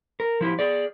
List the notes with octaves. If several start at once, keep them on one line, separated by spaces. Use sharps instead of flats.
A#4
F3 E4 G4
G#4 D5